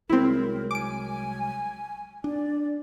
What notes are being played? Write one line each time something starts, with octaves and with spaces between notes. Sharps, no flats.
C2 F#3 G#3 C4 E4 A#4
G#5 D6 D7
D4 D5